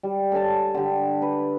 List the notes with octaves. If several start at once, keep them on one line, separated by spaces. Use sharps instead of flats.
G3
A4 C#5 G#5 A5
D3 G4
B4